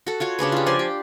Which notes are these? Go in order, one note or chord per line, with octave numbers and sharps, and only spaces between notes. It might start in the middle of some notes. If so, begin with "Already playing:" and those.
F#4 A4
F4 F#4 C#5
C#3 D4 G#4 B4
F4 G4
F3 D5 G#5 C6
G4